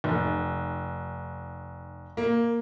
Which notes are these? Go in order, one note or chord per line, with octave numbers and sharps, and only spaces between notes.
F1
A#3